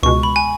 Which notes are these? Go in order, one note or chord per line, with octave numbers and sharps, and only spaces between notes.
C#2 B2 G#3 C#6
B5
G#5